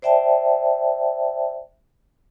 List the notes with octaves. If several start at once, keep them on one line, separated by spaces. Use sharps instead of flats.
C5 D5 E5 G5 A5